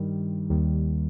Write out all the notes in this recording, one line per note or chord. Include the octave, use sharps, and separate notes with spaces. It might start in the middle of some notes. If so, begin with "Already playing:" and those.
Already playing: G2 D#3 G3
D#2 D#3 G3